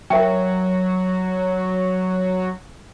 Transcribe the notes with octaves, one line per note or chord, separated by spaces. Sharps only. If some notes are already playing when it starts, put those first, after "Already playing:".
F#3 A#4 E5 G5